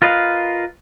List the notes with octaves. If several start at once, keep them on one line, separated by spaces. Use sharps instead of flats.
F4 A#4 B4 D#5 F5